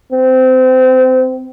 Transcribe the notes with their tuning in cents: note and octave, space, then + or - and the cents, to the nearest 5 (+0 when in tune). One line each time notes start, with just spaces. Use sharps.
C4 -25